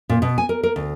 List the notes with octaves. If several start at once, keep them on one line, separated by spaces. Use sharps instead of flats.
A#2
B2
G#5
A#4
A#4
D2